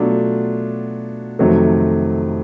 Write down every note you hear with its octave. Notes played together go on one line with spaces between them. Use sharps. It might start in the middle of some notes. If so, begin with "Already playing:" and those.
Already playing: B2 F#3 A3 D4 F4
F2 C3 D#3 F#3 A3